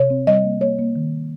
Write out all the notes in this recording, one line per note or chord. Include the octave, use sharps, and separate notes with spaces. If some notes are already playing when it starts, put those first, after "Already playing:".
Already playing: C3 C#5
C4
G3 D#5
A#3
A#3 C#5
A#3
D#3